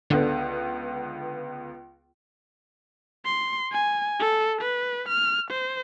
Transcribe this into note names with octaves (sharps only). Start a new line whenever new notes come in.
C#2 D3 B3
C6
G#5
A4
B4
F6
C5